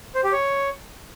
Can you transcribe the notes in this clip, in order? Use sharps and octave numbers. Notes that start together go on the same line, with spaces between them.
C5
G4
C#5